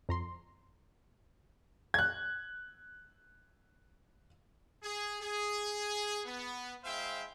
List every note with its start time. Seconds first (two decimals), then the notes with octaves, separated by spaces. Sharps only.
0.09 F2 A#5 C6
1.94 F#6 G#6
4.83 G#4
5.20 G#4
6.25 B3
6.84 G#3 E4 C5 E5 F5 G5